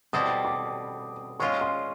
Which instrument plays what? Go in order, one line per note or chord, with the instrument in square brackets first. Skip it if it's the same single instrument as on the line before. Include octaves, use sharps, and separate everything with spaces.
[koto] B2 G3 C4 E4 A4 [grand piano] D#6
[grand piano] D6
[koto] G#3 C#4 F4 [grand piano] C#6
[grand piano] C6